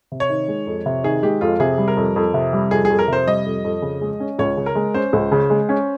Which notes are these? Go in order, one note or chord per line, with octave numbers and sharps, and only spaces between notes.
C3
C#5
D#3
G#3
F2
C3
D#3 G#4
G#3 G4
F2 F4
C3 G#4
G3
A#4
F2
F2
C3
G3
F2 G#4
F2 G#4
A#4
C3 C5
G3 D#5
F2
F2
C#3
G#3
C#4
C#2 C#5
C#3
A#4
G#3
C#4 C5
C#2
C#3
G#3
C#4